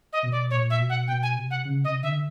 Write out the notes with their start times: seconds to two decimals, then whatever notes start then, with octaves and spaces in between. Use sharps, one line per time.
0.13 D#5
0.23 B2
0.32 D5
0.50 A#2 C#5
0.70 E5
0.79 B2
0.90 F#5
1.08 B2 G5
1.23 G#5
1.36 C3
1.51 F#5
1.65 C#3
1.84 C3 D#5
2.03 D3 E5